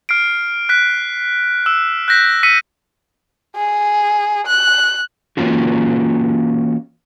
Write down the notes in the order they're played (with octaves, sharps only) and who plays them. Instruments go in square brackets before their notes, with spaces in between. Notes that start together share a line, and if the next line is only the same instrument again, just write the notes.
[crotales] F6 C7 D7
F#6 B6
E6 E7
F#6 G6 A#6 B6
E6 B6 C#7 D#7
[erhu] G#4
F#6
[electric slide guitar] E3 A#3 C#4 F4 F#4